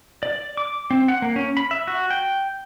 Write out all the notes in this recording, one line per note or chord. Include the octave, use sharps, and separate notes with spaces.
D5
D6
C4
F#5
A#3
C#4
B5
E5
F#4
G5